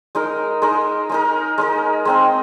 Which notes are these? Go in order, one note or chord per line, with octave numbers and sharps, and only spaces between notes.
G#3 D#4 A#4
G#3 D#4 A#4
G#3 D#4 A#4
G#3 D#4 A#4
G#3 C4 D#4